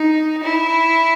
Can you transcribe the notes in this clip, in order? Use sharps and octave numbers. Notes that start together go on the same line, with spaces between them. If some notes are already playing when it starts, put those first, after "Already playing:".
Already playing: D#4
E4